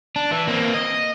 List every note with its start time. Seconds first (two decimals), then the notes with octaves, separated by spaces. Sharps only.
0.16 D4
0.31 E3
0.47 A#3 C4
0.74 D#5